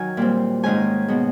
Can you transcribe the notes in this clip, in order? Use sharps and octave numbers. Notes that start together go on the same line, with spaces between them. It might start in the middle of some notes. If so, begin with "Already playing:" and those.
Already playing: D#3 F#3 G#5
A#2 G3 C4
G#2 D#3 G#3 C#4 G#5
B2 G#3 B3